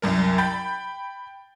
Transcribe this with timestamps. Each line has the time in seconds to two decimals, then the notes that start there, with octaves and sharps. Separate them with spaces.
0.02 C2 F#2 A#4
0.38 G5 B5 G6 A6